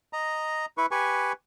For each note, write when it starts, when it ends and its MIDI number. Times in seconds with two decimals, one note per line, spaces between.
0.13 0.66 75
0.13 0.66 82
0.78 0.86 64
0.78 0.86 71
0.78 0.86 85
0.91 1.33 67
0.91 1.33 71
0.91 1.33 80
0.91 1.33 85